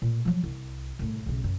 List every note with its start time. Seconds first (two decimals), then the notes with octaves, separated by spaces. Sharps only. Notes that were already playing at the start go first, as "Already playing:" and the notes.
0.02 A#2
0.25 F3 F#3
0.44 C2
0.99 C2 A2
1.26 B1 C#3
1.44 F#2